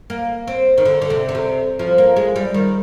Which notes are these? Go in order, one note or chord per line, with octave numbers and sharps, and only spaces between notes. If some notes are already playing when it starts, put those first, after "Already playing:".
A#3
C4
D#3
D3
D3
C3
D3
C3
F3
A#3
G#3
G3
D#3